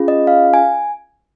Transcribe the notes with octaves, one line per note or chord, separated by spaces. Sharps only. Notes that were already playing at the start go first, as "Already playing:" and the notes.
Already playing: C#4 F4 G#4
D#5
F5
G#5